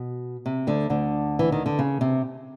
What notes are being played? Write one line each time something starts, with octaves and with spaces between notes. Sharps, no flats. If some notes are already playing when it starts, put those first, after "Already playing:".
Already playing: B2
C3
D2 D3
D2 D3
E3
D#3
D3
C#3
C3